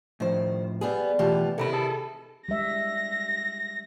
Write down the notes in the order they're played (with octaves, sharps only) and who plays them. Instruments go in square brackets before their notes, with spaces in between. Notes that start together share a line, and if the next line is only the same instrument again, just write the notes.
[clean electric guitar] A2 F3 [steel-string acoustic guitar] D#3 C5
[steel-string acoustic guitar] G3 B3 G#4
[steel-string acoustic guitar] B2 F4 G4 [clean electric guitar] E3 A3
[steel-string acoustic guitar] C3 D#3 E4 [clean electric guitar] A4 A#5 B5
[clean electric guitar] G#4 A4 A5
[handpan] G3 G#3 E5 [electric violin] A#6